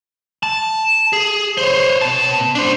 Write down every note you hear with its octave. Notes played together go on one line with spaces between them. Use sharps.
A5
G#4
C5 C#5
B2 A5
D4 C5